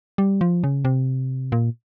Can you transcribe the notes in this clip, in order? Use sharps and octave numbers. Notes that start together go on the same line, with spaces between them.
G3
F3
C#3
C3
A#2